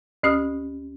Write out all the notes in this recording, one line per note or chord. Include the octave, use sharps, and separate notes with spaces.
D2 C#4 G4 D#6 F6